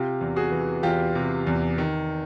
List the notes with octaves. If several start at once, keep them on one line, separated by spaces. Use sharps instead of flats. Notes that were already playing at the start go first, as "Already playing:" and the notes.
Already playing: C3 F4 G4
E2
F#4 G#4
E3
E2 F4 G4
C3
E2
D#3